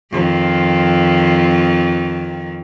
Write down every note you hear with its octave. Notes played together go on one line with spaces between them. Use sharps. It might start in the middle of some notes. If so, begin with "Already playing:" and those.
F2 D#3